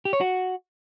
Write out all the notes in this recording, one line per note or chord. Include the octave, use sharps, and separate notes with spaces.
G4
C#5
F#4